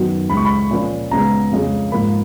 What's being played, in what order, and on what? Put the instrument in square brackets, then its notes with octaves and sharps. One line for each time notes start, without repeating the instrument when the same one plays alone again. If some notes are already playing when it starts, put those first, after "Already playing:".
Already playing: [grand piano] F#2 D#3 F#3 B3
C#2 C#3 G#3 B5
C#6
B5
A#2 F3 A#3 C#4
C#2 C#3 G#3 B3 A#5
F2 C#3 G#3
G#2 F3 A#3 B5